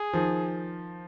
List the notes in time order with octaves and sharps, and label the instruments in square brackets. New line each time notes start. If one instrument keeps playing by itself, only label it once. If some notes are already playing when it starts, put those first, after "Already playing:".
Already playing: [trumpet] G#4
[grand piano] D#3 F3